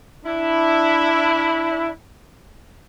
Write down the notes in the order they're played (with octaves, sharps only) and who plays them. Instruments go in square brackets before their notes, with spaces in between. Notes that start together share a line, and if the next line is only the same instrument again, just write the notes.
[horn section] D4 E4